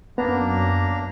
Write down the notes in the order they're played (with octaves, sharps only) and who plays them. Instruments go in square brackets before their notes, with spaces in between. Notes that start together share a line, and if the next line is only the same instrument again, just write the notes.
[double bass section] F#2 [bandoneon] A#3 D4 A#5 [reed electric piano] B3